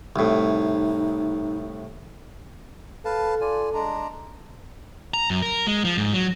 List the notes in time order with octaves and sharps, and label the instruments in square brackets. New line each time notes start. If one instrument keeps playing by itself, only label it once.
[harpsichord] C2 A2 [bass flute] D#4
[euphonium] A4 [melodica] B4 F5 A5
[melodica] F4 D5 G#5
G#3 D4 A#5
[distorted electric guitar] A#5
F#2
A#4
G#3
F3
G#2
F#3